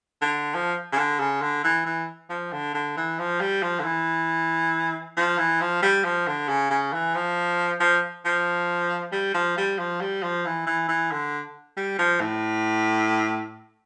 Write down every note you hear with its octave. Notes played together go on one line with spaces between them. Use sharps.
D3
F3
C#3
D3
C#3
D3
E3
E3
F3
D3
D3
E3
F3
G3
F3
D3
E3
F3
E3
F3
G3
F3
D3
C#3
C#3
E3
F3
F3
F3
G3
F3
G3
F3
G3
F3
E3
E3
E3
D3
G3
F3
A2